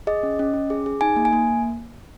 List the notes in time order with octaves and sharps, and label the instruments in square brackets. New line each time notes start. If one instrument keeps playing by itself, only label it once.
[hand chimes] G#4 D#5
C#4
C#4
C#4
G#4
G#4
D#4 G#5
A#3
G#5
A#3